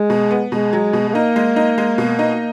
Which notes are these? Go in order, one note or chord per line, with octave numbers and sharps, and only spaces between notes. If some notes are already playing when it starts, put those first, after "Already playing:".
Already playing: G#3
B2
B3
B2 G#3
F#3
B2
G#3
A#3 D#4
G#3
D#4
G#3
B2
D#4